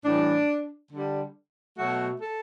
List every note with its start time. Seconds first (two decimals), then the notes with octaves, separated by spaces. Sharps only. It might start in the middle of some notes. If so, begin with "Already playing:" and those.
0.04 A2 E3 G3 D4
0.91 D3 G3
1.78 B2 F#3 A3 F#4
2.22 A4